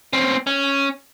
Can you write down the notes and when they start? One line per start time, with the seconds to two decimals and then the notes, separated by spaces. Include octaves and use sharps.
0.13 C4 C#4
0.47 C#4